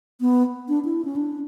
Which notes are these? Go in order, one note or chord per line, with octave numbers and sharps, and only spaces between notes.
B3
D4
E4
C#4
D4